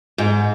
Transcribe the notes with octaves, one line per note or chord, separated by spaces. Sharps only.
G#2